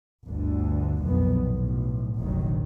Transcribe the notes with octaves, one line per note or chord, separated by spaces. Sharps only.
G1 D2 D3
B1 F2 A#2 D#3 B3
B1 A2
F1 A#1 F2 D#3 F#3